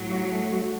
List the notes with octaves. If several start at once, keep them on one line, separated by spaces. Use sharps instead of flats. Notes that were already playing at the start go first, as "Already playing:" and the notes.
Already playing: A2 F#3
F#4
A3
F#4